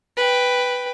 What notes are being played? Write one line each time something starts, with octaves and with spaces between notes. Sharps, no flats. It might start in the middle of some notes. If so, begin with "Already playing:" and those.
B4 G5